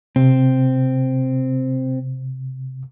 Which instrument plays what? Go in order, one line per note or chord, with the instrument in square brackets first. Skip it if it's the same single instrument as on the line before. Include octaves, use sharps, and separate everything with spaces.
[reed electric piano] C3 [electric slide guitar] C4